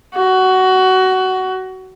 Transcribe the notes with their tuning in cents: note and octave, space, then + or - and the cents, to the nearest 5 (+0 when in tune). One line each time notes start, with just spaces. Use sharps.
F#4 +15